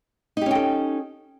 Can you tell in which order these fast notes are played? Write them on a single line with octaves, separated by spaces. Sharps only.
D#4 G4 C#4 G5 A4